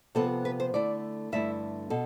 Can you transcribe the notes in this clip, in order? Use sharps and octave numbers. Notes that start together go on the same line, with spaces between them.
C3 F3 B3 A4
B4
C5
D3 A3 E4 D5
G2 D3 A3 E4 E5
B2 A4